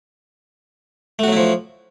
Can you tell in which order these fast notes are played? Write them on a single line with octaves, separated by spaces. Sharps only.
A3 F#4 F#3 E4 F3